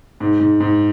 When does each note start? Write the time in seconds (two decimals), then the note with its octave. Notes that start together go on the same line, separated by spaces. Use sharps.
0.20 G#2
0.40 G#2
0.60 G#2